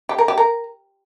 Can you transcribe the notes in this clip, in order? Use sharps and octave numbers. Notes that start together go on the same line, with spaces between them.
G4
A#4
G4
A#4